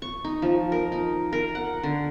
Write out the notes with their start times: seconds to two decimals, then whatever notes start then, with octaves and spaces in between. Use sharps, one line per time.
0.02 C#6
0.24 D#4
0.42 F3
0.72 A#4
0.92 D#4
1.33 A#4
1.55 F#5
1.83 D3